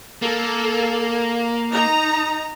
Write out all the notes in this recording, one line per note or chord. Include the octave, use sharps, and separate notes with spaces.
A#3 A4
D#4 A#5